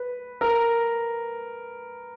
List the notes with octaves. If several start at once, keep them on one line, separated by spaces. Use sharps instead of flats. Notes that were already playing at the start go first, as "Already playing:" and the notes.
Already playing: B4
A#4